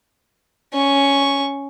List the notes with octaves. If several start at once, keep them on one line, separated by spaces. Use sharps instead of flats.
C#4 C#6